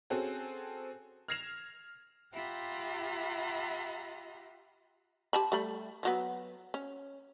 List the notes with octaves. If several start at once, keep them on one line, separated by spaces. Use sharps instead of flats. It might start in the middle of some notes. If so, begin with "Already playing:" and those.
C4 C#4 F#4 G#4 A4
F6 G#6 A#6 C7 E7 F7
F4 G4 E5 F#5 A#5 B5
G4 A5 B5
G3 A3 B5
F3 F#3 B3
C#4